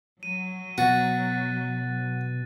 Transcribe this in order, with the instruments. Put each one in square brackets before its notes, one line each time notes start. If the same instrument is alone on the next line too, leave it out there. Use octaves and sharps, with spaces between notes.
[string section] F#3 [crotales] D#7
[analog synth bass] B2 [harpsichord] F#4 [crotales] F#6 A6